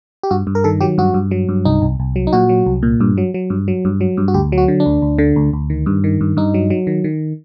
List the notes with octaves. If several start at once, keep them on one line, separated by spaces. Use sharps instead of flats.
G4
G2 F#4
G2
A#4
D#3 A4
F#3 G4
G2 F#4
G2
F#3
G2
C2 D#4
C2
C2
F#3
D#4
A#2 F#4
F#3
C2
A#2
G2
F#3
F#3
G2
F#3
G2
F#3
G2
F#4
D2 G4
F#3
F#4
D3
D4
D2
D2
D3
D2
D2
D#3
G2
D#3
G2
G2 D#4
F#3
F#3
D#3
D#3